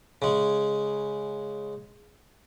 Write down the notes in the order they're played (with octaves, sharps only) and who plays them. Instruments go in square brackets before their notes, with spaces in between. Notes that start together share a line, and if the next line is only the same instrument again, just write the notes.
[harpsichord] C#3 G#3